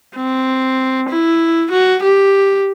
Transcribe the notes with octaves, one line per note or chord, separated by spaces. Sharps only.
C4
E4
F#4
G4